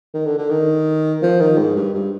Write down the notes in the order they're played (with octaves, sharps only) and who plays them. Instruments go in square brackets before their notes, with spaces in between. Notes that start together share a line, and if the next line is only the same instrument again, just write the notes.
[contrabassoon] D#3
D3
D3
D#3
F3
D#3
G#2
G2
G2